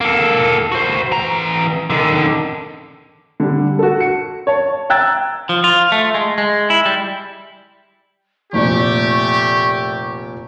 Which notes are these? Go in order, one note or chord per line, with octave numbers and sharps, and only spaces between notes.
A#3 A4
F#4 C5
E3 A#5
D3 D#3
D3 G3
F#4 A4
C#7
C#5 A5
G5 A#5 E6 F#6 G#6 A6
F3
F4
A3
G#3
G#3
E4
G3
F1 A#2 A3 G4 D5 C#6